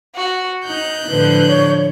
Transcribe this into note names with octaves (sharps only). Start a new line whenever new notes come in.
F#4
D#4 F#6 G6
A2 D3 F3 B4
C#5